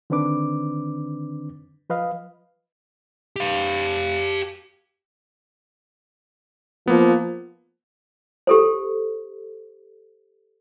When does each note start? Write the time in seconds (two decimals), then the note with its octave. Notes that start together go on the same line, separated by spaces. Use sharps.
0.10 D3 D#3 C4 D4 B4 D6
1.90 F3 B4 D#5 F5
3.36 G4 F5
6.87 F3 A#3 B3
8.47 G4 A4 C5